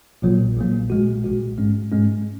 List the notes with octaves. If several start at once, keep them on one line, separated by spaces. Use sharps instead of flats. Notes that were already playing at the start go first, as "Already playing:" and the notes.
A#1 A#2 F#3 A#3
A#1 A#2 F#3 A#3
A#1 A#2 G#3 F#4
A#1 A#2 G#3 F#4
G#2 G#3 C#4
G#2 G#3 C#4